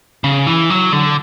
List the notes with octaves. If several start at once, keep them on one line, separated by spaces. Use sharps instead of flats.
C#3
E3
F#3
D3